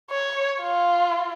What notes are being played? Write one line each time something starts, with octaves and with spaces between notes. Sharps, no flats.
C#5
F4